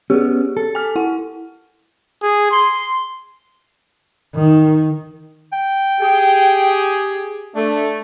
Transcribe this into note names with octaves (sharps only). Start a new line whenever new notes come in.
B3 C#4 G4 G#4
A4
G#5 F6
E4 F#5
G#4
C6
D#3
G5
G4 G#4
A3 D4